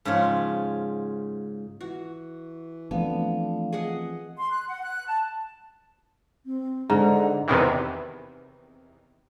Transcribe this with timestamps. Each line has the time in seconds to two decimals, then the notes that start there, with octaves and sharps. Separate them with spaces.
0.05 G#2 C#3 F3 F4 C#5
1.81 E3 F#4
2.91 D3 E3 F3 A3 B3 C4 F5
3.73 C3 G#4 D#5 F#5
4.37 C6
4.51 F#6
4.68 F#5
4.84 F#6
5.07 A5
6.46 C4
6.90 G#2 D3 F#5 A#5
7.48 E2 C3 D#3 E3